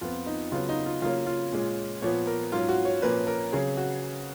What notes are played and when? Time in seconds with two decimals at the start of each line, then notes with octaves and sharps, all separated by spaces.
0.01 F2 F3 B3 F4
0.26 D#4
0.52 C#3 F#3 B3 F4
0.69 D#4
0.86 F4
1.02 C#3 F#3 A#3 C#4 F4
1.26 F4
1.52 A#2 G#3 C#4
2.02 A#2 F3 B3 C#5
2.27 A#4
2.52 G#2 F#3 C#4 F4
2.69 F#4
2.85 C#5
3.02 A#2 F3 A#3 C#4 B4
3.27 A#4
3.52 C#3 F#3 C#4 G#4
3.77 F#4